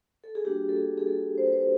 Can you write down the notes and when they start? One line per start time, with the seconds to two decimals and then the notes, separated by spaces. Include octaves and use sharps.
0.24 A4
0.35 G#4
0.45 G3 A#3 D4 F#4 G4
0.69 A4
0.76 G#4
0.98 G#4
1.07 A4
1.38 C5
1.45 B4
1.53 C5